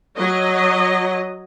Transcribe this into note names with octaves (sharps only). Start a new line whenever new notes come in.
F#3 D#5